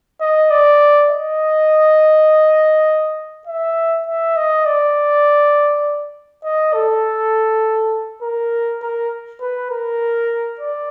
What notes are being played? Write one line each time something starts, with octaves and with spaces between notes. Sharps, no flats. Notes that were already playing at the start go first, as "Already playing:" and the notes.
D#5
D5
D#5
E5
E5
D#5
D5
D#5
A4
A#4
A#4
B4
A#4
D5